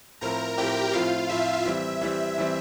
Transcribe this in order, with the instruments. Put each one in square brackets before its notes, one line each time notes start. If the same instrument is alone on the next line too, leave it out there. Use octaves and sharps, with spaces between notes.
[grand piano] A2 F3 C4 E4 [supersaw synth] A#4 A#5
[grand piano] A2 F3 C4 E4 [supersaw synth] G4 G5
[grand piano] A2 F3 C4 E4 [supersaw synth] F4 F5
[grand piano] A2 F3 C4 E4 [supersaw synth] E5
[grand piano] E3 G3 C4 [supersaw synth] E5
[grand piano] E3 G3 C4 [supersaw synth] E5
[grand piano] E3 G3 C4